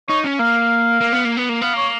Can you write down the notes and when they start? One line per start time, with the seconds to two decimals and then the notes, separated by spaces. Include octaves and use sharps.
0.09 D#4 C#5
0.24 C#4
0.39 A#3 F5
1.01 A#3
1.12 B3
1.25 A#3
1.37 B3
1.49 A#3
1.61 B3 F5
1.74 A#3 C#5